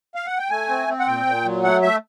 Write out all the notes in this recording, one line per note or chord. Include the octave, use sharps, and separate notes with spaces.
F5
F#5
G5
A3 G#5
C4
C4
F#5
A#2 G5
A#2
F#3
A3 F#5
A3 E5